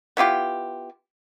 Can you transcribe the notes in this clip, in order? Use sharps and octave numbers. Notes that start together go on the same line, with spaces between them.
B3 E4 F4 G4